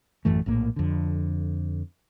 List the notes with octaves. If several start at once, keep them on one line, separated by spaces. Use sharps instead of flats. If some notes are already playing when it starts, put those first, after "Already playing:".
A1 F#2 E3 A3
A#1 A2 A#3
F2 D3